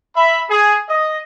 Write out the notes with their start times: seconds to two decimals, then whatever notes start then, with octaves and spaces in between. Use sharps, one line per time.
0.15 E5 B5
0.50 G#4
0.89 D#5